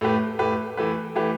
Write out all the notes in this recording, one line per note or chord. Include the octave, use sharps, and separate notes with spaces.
A2 A3 G4 B4
A2 A3 G4 B4
E3 A3 G4 B4
E3 A3 G4 B4